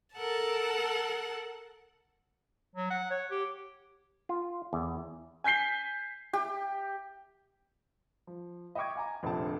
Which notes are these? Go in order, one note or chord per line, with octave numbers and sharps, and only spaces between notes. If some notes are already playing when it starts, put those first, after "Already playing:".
A4 A#4 F#5 A5
F#3
F#5
C#5
G4
F4
E2
G#5 G6 B6 C7 G7
G4
F3
D#5 E5 G5 C#6 D6 G#6
F5 G#5 A#5
F1 A#1 D3 F3 C4 A5